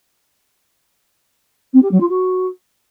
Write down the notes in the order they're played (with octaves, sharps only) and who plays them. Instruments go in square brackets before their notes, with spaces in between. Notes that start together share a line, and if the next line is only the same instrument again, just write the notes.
[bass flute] C4
G4
F#3
F4
F#4